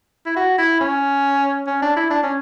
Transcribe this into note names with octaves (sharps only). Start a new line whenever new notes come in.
E4
F#4
E4
C#4
C#4
D4
E4
D4
C#4